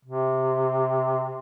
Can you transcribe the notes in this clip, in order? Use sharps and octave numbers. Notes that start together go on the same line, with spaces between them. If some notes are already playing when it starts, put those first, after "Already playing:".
C3